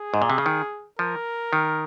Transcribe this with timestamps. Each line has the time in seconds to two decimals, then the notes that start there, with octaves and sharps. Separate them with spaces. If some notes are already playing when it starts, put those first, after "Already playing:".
Already playing: G#4
0.14 G#2
0.22 A#2
0.30 C3
0.38 C#3
0.46 D#3
0.99 F3 A#4
1.53 D#3